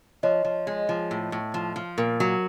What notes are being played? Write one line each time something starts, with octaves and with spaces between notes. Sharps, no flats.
F3 C#5 D#5
F3
G#3
F3
A2
A2
F3
F3
A#2 A#4
F#3